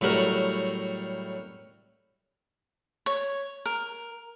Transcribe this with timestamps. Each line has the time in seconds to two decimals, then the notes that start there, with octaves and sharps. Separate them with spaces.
0.01 A2 F#3 G3 F#4 A#4
3.06 C#5
3.66 A#4